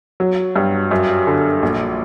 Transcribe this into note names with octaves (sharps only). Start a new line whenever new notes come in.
F#3
G2
F#2
D3
A#1